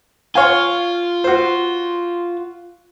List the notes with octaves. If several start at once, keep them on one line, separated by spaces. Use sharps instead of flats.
F4 C#5 F5 G#5
F#4 C5